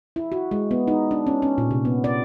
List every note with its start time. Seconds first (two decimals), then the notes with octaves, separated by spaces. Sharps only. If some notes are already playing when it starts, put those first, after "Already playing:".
0.16 E4
0.32 F#4
0.51 G#3
0.71 B3
0.88 D#4
1.11 D4
1.27 C#4
1.42 C#4
1.58 A#2
1.71 C3
1.85 B3
2.04 D5